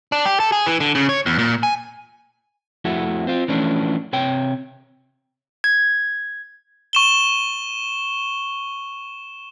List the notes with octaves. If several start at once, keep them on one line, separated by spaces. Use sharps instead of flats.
D4
G4
A4
G#4
E3
D3
C#3
C#5
E2
A#2
G#5
F2 A3 E4 F#4
C4 F4
E3 F3 A3 C#4 D4
C3 C#5 G5
G#6
C#6 E7 G7